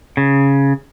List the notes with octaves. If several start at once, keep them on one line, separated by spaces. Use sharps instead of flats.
C#3